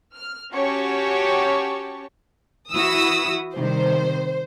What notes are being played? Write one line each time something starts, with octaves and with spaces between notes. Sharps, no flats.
F6
C#4 F#4 G4 C#5 A5 C#6
E3 E4 F#4 D#6 E6
C3 D#3 G3 C5